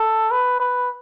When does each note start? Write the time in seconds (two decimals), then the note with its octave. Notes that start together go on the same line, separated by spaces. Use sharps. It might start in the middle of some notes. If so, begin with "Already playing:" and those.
Already playing: A4
0.31 B4
0.60 B4